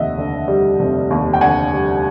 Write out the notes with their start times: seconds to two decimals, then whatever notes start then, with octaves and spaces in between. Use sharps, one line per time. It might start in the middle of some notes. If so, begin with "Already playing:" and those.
Already playing: F1 D#2 D#5 E5 F#5
0.18 D3
0.48 G3
0.79 F1
1.10 D#2
1.33 G5
1.41 D3 F#5 G#5
1.73 G3